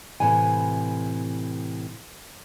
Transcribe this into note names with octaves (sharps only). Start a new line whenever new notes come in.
A2 C3 E3 G#5